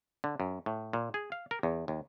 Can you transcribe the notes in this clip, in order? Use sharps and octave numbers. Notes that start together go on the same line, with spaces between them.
D3
F#2
A2
A#2
G#4
F5
A#4
E2
D#2